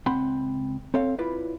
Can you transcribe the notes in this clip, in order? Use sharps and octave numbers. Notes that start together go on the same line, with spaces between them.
C#2 C4 F#5 B5 C6
C4 A4 C#5 F5
E4 F4 B4 D5